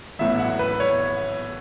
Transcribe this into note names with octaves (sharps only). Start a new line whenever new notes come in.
A1 A2 F#3 B3 E5
F#5
B4
C#5